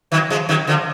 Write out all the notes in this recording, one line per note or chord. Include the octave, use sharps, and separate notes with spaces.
D#3 F#3
F3 G#3
D#3 F#3
D3 F3